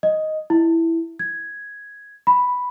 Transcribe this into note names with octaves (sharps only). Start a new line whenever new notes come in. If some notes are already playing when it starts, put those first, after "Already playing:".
D#5
E4
G#6
B5